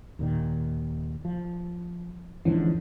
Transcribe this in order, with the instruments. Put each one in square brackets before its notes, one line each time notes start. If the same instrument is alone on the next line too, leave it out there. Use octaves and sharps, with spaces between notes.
[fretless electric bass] D#2 A#2 D#3
F3
[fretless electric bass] E2 G#2 D3 [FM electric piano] E3 F3 C#4